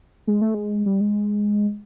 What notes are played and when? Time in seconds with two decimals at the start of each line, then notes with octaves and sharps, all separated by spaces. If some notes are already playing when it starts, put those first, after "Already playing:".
0.27 G#3
0.41 A3
0.54 G#3
0.86 G3
1.01 G#3